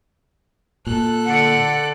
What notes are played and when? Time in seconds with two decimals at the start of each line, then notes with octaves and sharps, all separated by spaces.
0.87 A#2 A4 F#6
1.26 D3 D5 F#5